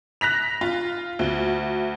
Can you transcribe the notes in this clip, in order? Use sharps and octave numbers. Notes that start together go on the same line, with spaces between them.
F#6 A#6 B6 F7
F4
D2